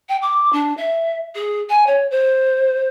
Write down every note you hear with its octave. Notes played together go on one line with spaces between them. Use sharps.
G5
D6
D4
E5
G#4
G#5
C#5
C5